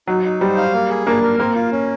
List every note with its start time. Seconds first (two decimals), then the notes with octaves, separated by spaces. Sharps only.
0.07 F#3 D#4
0.24 D#4
0.41 G3 C5
0.57 F5
0.73 A#3
0.89 G#4
1.06 A#3 D4
1.23 A#4
1.39 A#3 C4
1.55 F4
1.72 C#4